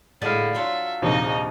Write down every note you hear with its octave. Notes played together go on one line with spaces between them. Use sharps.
A2 D3 G#3 E4 F5 A6
F#3 D4 F4 E5
A#1 D#2 C3 D#4 D#5